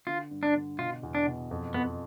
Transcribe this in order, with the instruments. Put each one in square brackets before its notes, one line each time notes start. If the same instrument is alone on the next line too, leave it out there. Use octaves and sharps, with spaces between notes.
[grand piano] D3 [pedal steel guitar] F4
[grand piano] G2
[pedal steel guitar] D4
[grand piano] D3
[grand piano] B2 [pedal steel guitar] F4
[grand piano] E2
[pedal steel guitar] D4
[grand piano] B2
F2
[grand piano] F2 [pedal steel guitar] B3